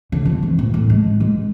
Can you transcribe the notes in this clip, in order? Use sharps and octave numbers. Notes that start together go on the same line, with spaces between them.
D3
F2
E3
A#1
A2
G#3
G#3